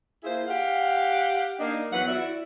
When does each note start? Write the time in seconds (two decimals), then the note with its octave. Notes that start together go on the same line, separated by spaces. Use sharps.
0.24 A#3 E4 F4 G#4 C5
0.47 G4 F5 F#5
1.59 A#3 D4 D#4
1.92 E2 F#3 B4 F#5
2.08 E4 F#4 D5 E5